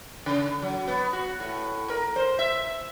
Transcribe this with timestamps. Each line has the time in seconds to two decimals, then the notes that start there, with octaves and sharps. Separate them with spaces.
0.26 C#3
0.62 F#3
0.88 B3
1.13 F#4
1.40 A2
1.90 A#4
2.16 C5
2.39 E5